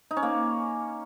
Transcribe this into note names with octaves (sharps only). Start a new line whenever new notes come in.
D#4
C#4
A#3